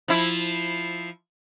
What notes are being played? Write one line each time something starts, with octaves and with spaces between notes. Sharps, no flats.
F3 E4